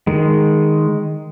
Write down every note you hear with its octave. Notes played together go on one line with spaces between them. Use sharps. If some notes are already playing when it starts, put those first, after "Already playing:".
D#3 G#3